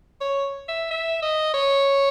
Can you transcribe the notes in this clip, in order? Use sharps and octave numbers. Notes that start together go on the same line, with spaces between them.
C#5
E5
E5
D#5
C#5